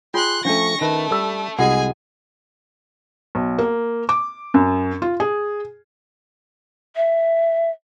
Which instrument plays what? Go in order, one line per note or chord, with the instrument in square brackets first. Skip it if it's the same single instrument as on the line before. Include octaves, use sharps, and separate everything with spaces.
[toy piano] F4 [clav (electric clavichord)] G#4 G5 [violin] C6 F#6
[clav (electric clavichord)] F3 A3 [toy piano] C#4 D4 [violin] C#6 A#6
[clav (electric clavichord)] D#3 B4 [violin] A3
[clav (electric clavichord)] G3 [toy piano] A4 E6
[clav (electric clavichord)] C2 G#3 D#5 [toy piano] F#4 F#5 [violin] G#4 G#5
[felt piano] B1
A#3
D6
F#2
F4
G#4
[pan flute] E5